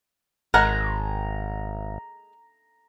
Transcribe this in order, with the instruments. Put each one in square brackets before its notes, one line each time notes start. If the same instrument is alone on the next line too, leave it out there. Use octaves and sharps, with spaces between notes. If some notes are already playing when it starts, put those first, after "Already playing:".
[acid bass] G#1 [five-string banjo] G#3 A#4 F#5 [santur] A#5